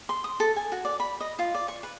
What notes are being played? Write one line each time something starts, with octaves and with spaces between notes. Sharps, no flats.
C6
D#6
A4
G#5
F#4
D5
B5
D#5
F4
D5
C#6
B4